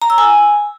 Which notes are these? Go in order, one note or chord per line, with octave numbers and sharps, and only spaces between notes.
A#5
E6
G#5